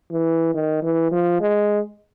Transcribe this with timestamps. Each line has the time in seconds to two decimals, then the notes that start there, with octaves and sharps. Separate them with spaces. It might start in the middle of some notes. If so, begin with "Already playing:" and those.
0.11 E3
0.54 D#3
0.83 E3
1.12 F3
1.41 G#3